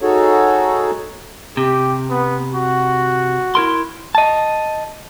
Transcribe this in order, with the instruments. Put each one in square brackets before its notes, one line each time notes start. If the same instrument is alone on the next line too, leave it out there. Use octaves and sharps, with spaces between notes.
[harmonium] D#4 F#4 G#4 A4 C#5
[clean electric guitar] C3 [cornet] G4
[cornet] B3
F#4
[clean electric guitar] E4 A#4 C6
[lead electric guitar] D#5 A5